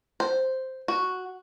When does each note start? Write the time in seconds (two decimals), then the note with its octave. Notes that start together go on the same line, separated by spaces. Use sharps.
0.20 C5
0.88 F#4